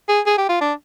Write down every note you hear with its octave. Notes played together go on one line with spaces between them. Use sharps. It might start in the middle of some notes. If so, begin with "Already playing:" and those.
G#4
G#4
G4
F4
D4